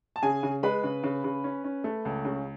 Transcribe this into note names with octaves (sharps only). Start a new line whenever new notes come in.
A5
C#3 G#4 G#5
C#3
G#3 B4 B5
C#3
C#3
C#3
C#4
C#4
A3
C#2
C#3